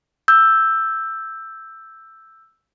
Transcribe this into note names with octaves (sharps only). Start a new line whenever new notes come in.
E6 G6